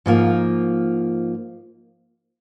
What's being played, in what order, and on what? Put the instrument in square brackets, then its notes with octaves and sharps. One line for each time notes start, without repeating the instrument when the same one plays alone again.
[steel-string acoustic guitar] G#2 F3 A#3 F4